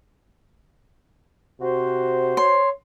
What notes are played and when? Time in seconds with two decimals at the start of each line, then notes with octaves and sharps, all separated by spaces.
1.60 C3 F#4 C5
2.37 C#5 C6